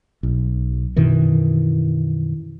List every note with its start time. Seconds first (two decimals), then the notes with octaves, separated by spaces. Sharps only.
0.23 B1
0.96 F#2 B2 D#3 E3